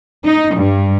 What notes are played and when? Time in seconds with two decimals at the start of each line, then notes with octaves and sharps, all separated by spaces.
0.24 D#4
0.56 G2